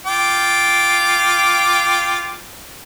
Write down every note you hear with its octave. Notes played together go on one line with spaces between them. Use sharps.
F4 G5 D6